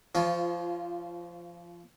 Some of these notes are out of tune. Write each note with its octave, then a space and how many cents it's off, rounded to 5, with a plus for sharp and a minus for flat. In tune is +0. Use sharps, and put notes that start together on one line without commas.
F3 -20 F4 +0 C#5 +15